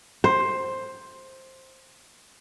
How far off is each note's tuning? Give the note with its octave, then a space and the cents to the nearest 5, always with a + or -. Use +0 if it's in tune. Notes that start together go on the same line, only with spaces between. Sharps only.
C5 +10